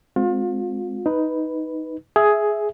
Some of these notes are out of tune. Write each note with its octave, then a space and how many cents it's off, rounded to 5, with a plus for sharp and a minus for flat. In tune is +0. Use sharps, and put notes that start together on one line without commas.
G#3 +15 C4 +0 F4 +35
D#4 +10 B4 +0
G#4 +10 E5 +0